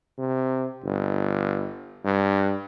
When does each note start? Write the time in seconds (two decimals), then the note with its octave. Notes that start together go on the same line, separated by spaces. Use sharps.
0.18 C3
0.84 G1
2.05 G2